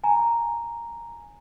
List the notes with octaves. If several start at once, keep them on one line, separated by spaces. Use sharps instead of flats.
G#5 A#5